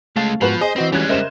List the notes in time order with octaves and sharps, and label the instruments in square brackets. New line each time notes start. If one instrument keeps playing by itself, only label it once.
[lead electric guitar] C#3 G#3 [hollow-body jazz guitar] A3 F5 A5
[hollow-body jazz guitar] G#2 F#4 [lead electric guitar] F3 [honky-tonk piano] B3 B4 F#7
[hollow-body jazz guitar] G#4 [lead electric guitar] C5 [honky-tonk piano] D#5
[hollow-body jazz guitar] E3 F#4 B4 [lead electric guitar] C4
[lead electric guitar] G3 G#3 [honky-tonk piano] C#4 F#6 G#6
[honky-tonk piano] C#3 C5 E7 [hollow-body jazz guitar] A#4 D#5 E5